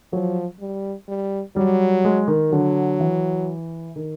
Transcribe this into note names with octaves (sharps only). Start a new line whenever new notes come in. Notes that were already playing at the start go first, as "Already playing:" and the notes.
F3 F#3
G3
G3
F#3 G3
G#3
D#3
D3 F#3
E3
D#3